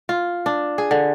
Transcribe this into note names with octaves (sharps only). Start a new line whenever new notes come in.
F4
D4
G#4
D3